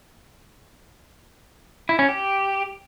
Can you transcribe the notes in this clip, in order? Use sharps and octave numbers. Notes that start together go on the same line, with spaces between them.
E4
C#4
G4